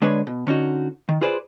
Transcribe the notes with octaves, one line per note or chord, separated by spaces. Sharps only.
D3 G#3 D4 B4 C#5
B2
D3 C#4 D#4 F#4
D#3
F4 G#4 B4 C5 D5